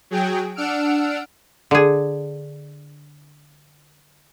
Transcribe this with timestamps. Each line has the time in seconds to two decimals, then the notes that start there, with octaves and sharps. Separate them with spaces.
0.11 F#3 G#4 G5
0.55 D4 F#5 E6 F6 D7
1.71 D3 G#4